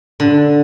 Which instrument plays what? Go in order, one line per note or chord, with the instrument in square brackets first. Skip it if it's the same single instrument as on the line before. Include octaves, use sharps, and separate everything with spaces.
[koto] D3